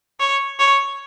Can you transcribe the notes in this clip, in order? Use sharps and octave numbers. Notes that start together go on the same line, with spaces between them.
C#5
C#5